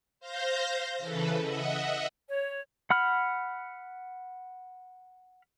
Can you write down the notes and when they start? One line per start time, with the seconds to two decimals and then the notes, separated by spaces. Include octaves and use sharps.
0.20 C5 F5 G6 A#6
0.98 C#3 E3 A4 B4
1.42 D#5 E5 F#5
2.28 C#5
2.90 F#5 B5 F6